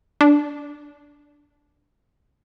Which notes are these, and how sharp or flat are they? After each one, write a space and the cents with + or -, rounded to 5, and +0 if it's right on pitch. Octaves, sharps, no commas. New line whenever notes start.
D4 -5